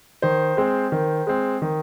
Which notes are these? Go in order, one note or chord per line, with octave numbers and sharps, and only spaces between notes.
D#3 C5
G#3 C4
D#3
G#3 C4
D#3